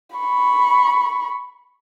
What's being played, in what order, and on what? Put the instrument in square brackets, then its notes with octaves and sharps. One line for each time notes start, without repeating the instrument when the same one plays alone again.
[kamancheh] B5 C#6